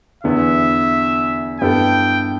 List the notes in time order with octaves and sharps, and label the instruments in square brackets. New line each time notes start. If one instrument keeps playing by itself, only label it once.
[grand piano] E2 D3 B3 E4 [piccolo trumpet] E5
[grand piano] G2 G3 B3 E4 A4 [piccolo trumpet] G5